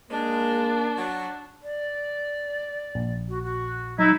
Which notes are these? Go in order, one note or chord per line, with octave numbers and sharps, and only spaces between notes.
G#3 A#3 D4
F#3
D5
A#1
F#4
F#4
F#3 D#4 E4